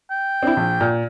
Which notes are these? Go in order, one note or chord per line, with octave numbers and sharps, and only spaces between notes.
G5
C4 D4 E4
A#1
A#2